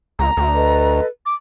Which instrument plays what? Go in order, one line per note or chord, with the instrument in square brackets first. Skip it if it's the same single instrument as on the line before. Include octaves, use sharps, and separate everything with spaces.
[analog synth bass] C#2 [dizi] A#5
[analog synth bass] D2
[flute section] A4 B4 D#5
[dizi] D6